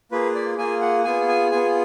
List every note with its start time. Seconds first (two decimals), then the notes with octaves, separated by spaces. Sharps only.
0.11 A#3 F4 G#4 B4
0.35 D5
0.58 A#3 F4 G#4 G#5
0.81 F#5
1.04 B3 F4 G#4 G#5
1.28 G#5
1.51 B3 F4 G#4 G#5